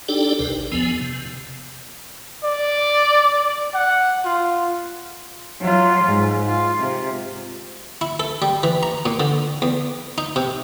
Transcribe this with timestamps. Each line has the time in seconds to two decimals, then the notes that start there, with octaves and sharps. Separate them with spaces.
0.08 D4 D#4 G4 A4 D5 G5
0.39 D2 C3 A#4 B4
0.52 G#1
0.72 E2 F3 B3 G#5
1.01 C3
2.44 D5
3.74 F#5
4.25 F4
5.60 F#3 F4
6.05 G#2
6.47 F4
6.79 C3
8.01 E4
8.20 A4
8.42 G3
8.63 E3
8.83 A#5
9.06 A#2
9.20 D3
9.62 E2
10.18 D#4
10.36 C3